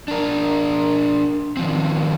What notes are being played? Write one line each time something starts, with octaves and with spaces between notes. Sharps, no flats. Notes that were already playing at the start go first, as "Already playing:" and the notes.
D4 A#4
D#3 F3 C4